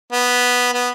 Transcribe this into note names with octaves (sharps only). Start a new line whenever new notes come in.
B3
B3